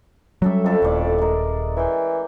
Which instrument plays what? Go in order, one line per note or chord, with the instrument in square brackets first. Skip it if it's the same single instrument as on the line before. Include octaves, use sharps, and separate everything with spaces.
[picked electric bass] F#3 G3 [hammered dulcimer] C#4 A4 E5
[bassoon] F2 [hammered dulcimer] C#4 A4
[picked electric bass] D#1 [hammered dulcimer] A2 D5
[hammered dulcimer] G#3 A#4
[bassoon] E3 [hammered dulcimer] G5 G#5